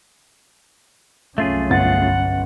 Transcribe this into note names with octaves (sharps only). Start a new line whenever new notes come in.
C2 F#2 A3 C#4 F4 G#4
G1 F#5 A6